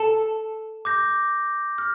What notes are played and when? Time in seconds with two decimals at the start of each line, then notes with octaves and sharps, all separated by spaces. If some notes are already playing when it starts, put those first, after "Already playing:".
Already playing: A4
0.85 D6 G6 A#6
1.78 F6